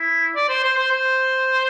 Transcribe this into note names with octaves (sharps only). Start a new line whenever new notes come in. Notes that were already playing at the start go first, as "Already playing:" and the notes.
Already playing: E4
D5
C5
C5
C5
C5